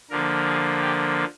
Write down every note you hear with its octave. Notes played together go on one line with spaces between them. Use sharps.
D3 F3 A#3 A#4
G#4
G4